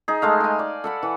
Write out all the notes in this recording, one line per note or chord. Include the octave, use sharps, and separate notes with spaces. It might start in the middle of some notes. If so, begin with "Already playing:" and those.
D#4 G#4
G#3 A3 F5
G5 G#5
D5
A4 F#5 B5
E3